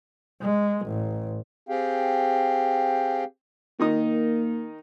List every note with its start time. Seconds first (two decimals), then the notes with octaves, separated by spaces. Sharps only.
0.42 G#3
0.87 A1
1.69 C4 G4 G#4 F5 G5
3.80 D#3 A#3 D#4 D#6